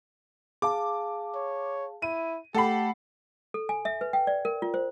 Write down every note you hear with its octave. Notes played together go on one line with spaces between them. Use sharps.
G#4 F5 A5 D6
C#5
E4 D#7
A3 G4 A4 F#5 B5 C7
A4
G#5
E5
B4
G5
D5
A#4
F4
C5